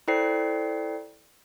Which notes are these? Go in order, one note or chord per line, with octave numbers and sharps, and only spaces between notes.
E4 A4 C5 D5 G5 C7